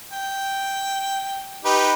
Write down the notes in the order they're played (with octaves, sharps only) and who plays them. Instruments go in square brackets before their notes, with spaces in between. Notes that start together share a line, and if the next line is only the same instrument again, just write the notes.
[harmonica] G5
D#4 G4 B4